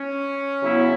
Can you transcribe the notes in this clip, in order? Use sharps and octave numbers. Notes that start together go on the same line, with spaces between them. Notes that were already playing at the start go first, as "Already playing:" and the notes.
Already playing: C#4
C#3 F#3 B3 E4